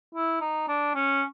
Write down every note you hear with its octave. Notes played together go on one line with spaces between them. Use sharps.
E4
D#4
D4
C#4